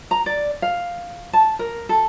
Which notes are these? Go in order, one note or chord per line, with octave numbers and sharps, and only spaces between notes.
A#5
D5
F5
A5
A#4
A4